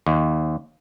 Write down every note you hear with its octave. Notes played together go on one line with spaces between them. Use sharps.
D#2